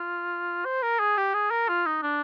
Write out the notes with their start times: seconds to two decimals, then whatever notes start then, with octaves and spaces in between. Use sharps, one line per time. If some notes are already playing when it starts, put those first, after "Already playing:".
Already playing: F4
0.65 C5
0.82 A#4
0.99 G#4
1.17 G4
1.34 G#4
1.51 A#4
1.68 F4
1.86 D#4
2.03 D4